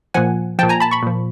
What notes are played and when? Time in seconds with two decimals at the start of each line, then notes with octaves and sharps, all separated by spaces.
0.14 A#2 F3 F#5 G#5
0.59 F3 G5 A5
0.63 A#2
0.69 G#5 A#5
0.80 A5 B5
0.91 B5 C#6
1.03 A#2 F3